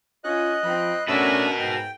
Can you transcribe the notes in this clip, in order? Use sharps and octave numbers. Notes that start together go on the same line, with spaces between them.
C#4 F4 D#5 F#6
F3 C4 B5
A3 C#4 D4 F#4 A#4 B4 G#5 E6
G#2 G5